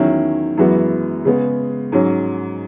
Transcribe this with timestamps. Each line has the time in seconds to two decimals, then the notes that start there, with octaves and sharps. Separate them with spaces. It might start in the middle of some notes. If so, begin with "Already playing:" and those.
Already playing: E2 D#3 F#3 C#4 E4
0.57 F#2 E3 G#3 B3 F#4
1.25 C#3 G#3 B3
1.92 G#2 F#3 C#4